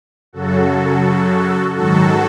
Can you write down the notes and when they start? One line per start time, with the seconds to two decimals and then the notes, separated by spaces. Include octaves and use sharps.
0.33 F#2 C#3 F#3 F#4 A4
1.75 G#2 D#3 F#3 F#4 A4